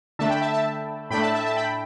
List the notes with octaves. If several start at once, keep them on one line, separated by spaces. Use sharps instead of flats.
D3 A3 D4 E5 A5
G5 B5
E5 A5
E5 A5
A2 A3 D4 G5 B5
E5 A5
E5 A5
E5 A5
G5 B5